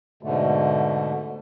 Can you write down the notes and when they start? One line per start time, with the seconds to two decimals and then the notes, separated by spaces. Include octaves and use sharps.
0.23 G#2 B2 D3 A3